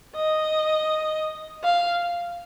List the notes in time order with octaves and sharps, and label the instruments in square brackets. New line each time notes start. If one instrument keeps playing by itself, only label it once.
[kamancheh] D#5
F5